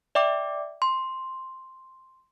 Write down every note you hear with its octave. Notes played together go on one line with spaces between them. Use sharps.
D5 E5 G5 D6
C6